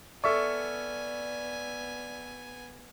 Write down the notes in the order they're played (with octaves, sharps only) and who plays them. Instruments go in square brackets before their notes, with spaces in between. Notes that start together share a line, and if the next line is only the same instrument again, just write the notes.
[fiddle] B3 G#5 [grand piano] A4 E5 C#6 [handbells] D5 F6